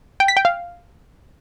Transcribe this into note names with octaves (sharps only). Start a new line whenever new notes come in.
G5
B6
G5
F5